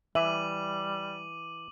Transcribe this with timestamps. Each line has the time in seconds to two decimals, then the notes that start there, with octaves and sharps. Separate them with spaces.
0.15 E3 G3 E5 D6 D#7 F#7